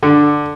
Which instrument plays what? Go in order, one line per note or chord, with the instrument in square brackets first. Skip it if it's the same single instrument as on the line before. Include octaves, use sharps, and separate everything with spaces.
[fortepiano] D3